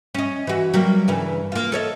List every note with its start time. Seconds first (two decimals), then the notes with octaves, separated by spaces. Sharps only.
0.14 C#4 D#5
0.47 E3 F#4
0.74 F#3 G3 A#3
1.08 G2 C#3 E3
1.52 A#3 F4
1.72 A4 C#5 D#5